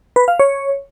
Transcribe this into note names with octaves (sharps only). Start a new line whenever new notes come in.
B4
F5
C#5